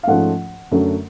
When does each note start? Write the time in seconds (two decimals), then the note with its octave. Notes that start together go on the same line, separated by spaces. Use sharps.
0.03 F5
0.07 G#2 F3 A3 C#4 F4 F#5
0.71 F#2 D3 F#3 A3